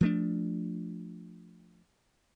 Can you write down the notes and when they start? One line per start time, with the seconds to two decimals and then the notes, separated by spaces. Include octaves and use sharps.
0.01 F3 A3 D4